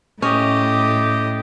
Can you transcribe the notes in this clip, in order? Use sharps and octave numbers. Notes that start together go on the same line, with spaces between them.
A2 C#4 G4 D#5